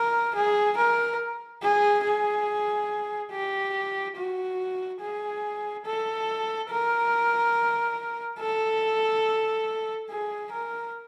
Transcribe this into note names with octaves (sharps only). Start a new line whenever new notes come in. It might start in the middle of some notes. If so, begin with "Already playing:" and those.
Already playing: A#4
G#4
A#4
G#4
G#4
G4
F#4
G#4
A4
A#4
A4
G#4
A#4